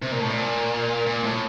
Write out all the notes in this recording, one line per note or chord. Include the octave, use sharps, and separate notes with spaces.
C3
A#2
A2
A#2
A#2
A2